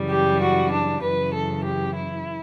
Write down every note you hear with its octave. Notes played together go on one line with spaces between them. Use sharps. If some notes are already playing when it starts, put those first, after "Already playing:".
Already playing: F#2 C#3 E3 G3
G4
F#4
D4
F#2 C#3 E3 B4
A4
G4
E4